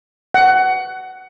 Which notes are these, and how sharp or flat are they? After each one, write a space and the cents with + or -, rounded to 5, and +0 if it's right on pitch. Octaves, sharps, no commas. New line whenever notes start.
F#5 +20